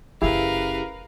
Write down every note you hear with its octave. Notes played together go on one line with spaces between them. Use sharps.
F#1 C#4 E4 G4 G#4 A#4 B4 F5